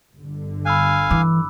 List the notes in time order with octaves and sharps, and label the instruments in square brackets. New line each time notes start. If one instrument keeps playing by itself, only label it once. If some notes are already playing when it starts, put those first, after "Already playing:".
[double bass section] G1 D3
[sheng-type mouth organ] F5 G#5 [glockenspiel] B5 E6 F#6
[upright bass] E3 [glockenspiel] D6